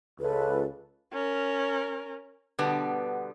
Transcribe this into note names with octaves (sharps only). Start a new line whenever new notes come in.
C#2 A4 B4
C#4 A#4
B2 D3 G3 B3